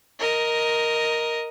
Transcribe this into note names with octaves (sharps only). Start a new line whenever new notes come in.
A#4 D#5